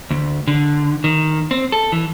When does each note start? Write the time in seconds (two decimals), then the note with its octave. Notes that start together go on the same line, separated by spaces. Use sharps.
0.10 D2
0.47 D3
1.04 D#3
1.51 C4
1.72 A4
1.92 E3